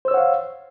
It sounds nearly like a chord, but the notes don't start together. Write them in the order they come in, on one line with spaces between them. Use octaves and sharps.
C5 E6 C#5 F#5 F5